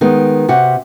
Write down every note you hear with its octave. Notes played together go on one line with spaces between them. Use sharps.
D#3 G#3 B3
C3 F#4 F#5